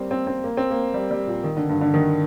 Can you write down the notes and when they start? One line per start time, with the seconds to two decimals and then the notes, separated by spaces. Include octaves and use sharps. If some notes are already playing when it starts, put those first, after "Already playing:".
Already playing: G3 A#3 C4
0.11 C4
0.27 C4
0.44 A#3
0.57 C4
0.71 A#3
0.94 G3
1.11 G3
1.27 A#2
1.44 D#3
1.57 D3
1.69 G2
1.81 D3
1.94 D#3